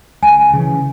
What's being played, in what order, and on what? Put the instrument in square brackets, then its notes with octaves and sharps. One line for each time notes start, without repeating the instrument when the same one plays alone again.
[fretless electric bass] C#2 [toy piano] G#5
[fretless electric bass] C#3 E3